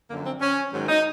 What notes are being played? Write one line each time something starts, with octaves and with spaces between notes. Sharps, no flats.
F#2 D3 F3 A#3
C4
C#4
G#2 D#3 F#3
D#4